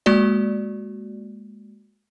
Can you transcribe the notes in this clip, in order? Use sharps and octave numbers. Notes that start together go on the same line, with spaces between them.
G#3 A#3 F#4 D5